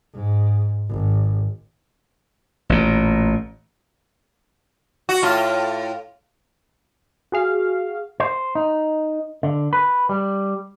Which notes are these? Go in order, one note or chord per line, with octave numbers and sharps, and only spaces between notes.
G#2
G#1
A1 A#2
F#4
A2 F4
F#4 G#4 F5
C5
D#4
D3
B4
G3